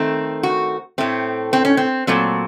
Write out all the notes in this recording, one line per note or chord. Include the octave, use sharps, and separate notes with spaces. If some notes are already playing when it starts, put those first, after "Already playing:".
Already playing: D#3 A3 C4
F#4
A2 A3 C4
C4
C#4
C4
A#2 F#3 A3 C4